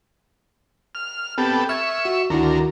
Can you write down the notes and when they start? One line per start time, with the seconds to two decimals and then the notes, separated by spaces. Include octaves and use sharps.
0.95 F6
1.38 B3 C4 G4 A4
1.69 E5 C#6 F6 G#6
2.05 F#4
2.30 D2 D#3 E4 F#4 A#4